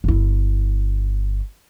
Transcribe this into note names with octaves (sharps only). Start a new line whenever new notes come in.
G1 E4